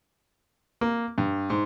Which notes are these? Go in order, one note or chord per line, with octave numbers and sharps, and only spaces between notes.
A#3
G2
G#2